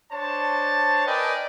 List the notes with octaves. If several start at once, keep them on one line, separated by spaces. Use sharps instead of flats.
D4 C5 C#5 A5
A#4 B4 D5 D#5 G5 G#5